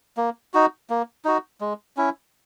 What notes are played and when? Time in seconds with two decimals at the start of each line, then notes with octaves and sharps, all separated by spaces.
0.17 A#3
0.54 D#4 F#4
0.90 A#3
1.25 D#4 F#4
1.61 G#3
1.97 C#4 E4